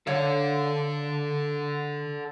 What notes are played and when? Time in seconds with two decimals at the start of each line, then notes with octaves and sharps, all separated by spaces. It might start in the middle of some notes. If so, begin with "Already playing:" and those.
0.07 D3 A4 C#5 D5 F5